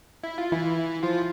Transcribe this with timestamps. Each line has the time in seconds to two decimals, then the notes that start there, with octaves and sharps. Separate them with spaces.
0.23 E4
0.38 F4
0.51 E3 E4
1.03 F3 F4